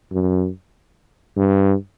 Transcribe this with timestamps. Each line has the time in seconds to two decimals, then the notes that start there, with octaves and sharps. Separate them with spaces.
0.12 F#2
1.37 G2